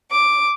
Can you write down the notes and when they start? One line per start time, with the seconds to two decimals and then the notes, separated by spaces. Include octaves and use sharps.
0.11 D6